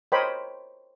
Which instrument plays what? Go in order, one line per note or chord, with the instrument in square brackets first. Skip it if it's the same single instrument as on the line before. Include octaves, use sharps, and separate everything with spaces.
[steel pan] A#4 C5 C#5 D#5 G5 B5